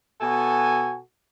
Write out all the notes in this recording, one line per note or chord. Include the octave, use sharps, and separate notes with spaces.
B2 F#4 A4 G#5